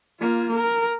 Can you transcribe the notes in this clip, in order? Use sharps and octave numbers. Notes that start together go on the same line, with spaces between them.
A#3 F4
A#4